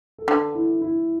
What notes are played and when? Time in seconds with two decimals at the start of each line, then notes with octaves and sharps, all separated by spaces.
0.18 A4
0.28 D3 B4
0.55 E4
0.82 E4